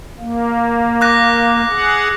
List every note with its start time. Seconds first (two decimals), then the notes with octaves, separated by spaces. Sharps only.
0.20 A#3
1.01 D6 F#6 A#6
1.69 G#4 F#5